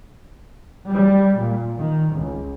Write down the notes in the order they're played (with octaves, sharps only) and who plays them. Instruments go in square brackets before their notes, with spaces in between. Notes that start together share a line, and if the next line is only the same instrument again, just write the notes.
[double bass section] G3
A#2
D#3
C#2